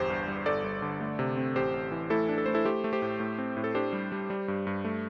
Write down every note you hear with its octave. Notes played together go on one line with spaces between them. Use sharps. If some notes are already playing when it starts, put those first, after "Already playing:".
Already playing: G1 E2 G4 C5
G2
G3
G1 A4 D5
G1
D3
A3
C3
C4
A1 G4 C5
A1
E3
A3 E4 A4
D4
A4
A3 C5
E4 A4
A3 G4 C5
A3
G4 C5
A2
A2
C4
A2
A4
D4 G4 C5
G3
G3
G3
G2
G2
A3